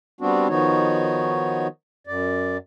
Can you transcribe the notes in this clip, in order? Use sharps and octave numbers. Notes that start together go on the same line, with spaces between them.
G3 B3 C4 D4 F#4
D#3 F3 B3 D#4 F#4 C#5
F#2 D5